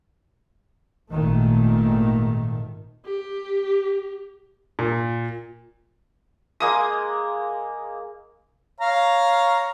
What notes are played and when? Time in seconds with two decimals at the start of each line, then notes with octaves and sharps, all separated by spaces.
1.13 G#1 A#2 D#3 A3
3.06 G4
4.79 A#2
6.60 G#3 A#3 D#6
8.81 C#5 F5 A#5